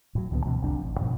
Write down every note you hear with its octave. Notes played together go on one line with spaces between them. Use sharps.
A2 F#3
C#2 D3 E3 B3
D2 B2 E3 C4
F1 C2 F2 D4
A1
G2 B2 F3